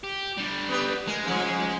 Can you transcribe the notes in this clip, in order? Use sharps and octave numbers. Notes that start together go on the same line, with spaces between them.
G4
D3 G3
B3 G4 B4
G#3 A#4
G#2 C#3 F3